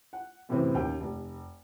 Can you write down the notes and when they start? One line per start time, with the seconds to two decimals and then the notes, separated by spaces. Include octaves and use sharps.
0.13 F#5
0.49 F#2 A2 C3 E3 C4
0.74 D#2 C#4 G5
1.00 F1